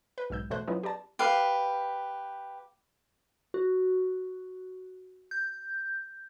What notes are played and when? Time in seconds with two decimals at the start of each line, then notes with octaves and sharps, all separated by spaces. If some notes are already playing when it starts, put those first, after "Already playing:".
0.18 B4
0.30 B1 G#2 E6 G6
0.50 E2 B2 A3 C5 F#6
0.67 F#3 B3 C#4 E4 F4 D#5
0.83 G4 B4 D5 A5
1.19 G4 B4 F5
3.54 F#4
5.31 G6